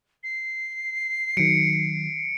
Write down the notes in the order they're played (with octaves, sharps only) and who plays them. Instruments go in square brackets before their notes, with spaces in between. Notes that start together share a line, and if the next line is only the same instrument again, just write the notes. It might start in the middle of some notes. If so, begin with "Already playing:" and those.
[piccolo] C7
[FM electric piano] D#3 F#3 [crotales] C#7 D7